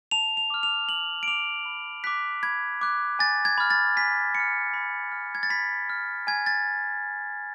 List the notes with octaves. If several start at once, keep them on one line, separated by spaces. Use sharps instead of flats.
A5 F7
F7
D6 F6
F7
A5 F#7
D7
D6 F6 F7
B5
D6 F#6 B6
B5 G#6
D6 F#6
G#5 A6
G#6
B5 F6
A6
G#5 B6
B5 C#7
F6
B5
F6
G#6
A6
B5 B6
F6
G#5 G#6
A6